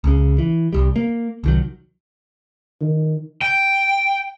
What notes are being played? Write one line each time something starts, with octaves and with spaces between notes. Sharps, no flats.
C#2 C#3
E3
C2 G3
A#3
C2 D#3 F#3
D#3
G5